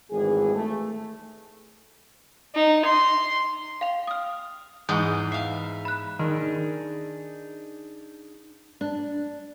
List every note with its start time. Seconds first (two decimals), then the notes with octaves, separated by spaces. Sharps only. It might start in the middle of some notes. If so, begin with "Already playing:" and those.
0.11 G#1 F2 A2 E3 G#4
0.55 A3
2.55 D#4
2.85 C6
3.81 F5 G5 F7
4.07 D#6 F6
4.89 E2 G#2 D#5 F#5 D#6 G6
5.32 E5 F5 C7
5.85 B5 F#6
6.19 D#3 D4 D#4 G#4
8.81 D4